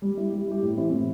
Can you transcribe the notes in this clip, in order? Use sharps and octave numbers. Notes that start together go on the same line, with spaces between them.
G3
E4 G4
G3
E4 G4
A2
E3 C4 E4
A2